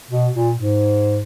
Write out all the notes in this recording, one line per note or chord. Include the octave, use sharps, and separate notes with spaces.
B2
A#2
G#2